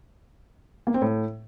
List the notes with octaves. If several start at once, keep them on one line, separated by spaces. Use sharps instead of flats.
A#3
C4
A2